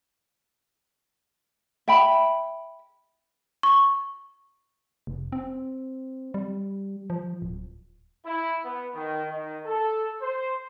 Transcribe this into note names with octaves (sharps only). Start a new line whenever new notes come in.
E5 G5 B5
C#6
F1
C4
G3
F3
D1
E4
B3
D#3
D#3
A4
C5